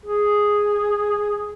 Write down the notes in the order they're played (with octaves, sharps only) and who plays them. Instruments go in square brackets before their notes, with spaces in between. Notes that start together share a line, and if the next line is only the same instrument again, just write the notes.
[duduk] G#4